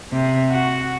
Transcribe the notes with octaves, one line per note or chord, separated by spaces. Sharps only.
C3
F#4